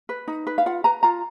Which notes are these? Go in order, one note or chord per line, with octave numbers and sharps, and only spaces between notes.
B4
D#4
B4
F5
F4 F#5
B4 A#5
F4 A#5